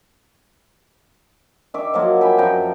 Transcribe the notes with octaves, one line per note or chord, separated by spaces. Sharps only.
D#3 E5 D6
F3 F#3 A#3 F4
E5 G5 G#5 B5
F#2 F3 G5 A#5